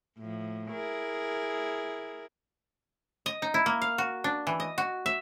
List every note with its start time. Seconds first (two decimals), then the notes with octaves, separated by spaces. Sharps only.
0.18 A2 F3
0.71 E4 G#4 A#4
3.26 D#5
3.42 D#4
3.54 E4
3.66 A#3
3.82 F5
3.98 F#4
4.24 D4
4.47 E3
4.60 D#5
4.78 F#4
5.06 E5